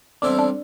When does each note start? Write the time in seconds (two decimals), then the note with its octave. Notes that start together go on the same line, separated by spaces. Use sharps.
0.22 E2 D3 G3 C4 D4 E4
0.38 D4